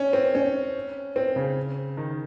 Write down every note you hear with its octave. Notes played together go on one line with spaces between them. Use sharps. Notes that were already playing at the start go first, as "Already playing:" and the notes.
Already playing: C#4
C4
C#4
C4
C#3
D#3